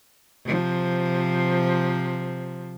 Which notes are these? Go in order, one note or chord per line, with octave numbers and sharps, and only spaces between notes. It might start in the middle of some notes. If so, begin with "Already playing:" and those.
C3 F3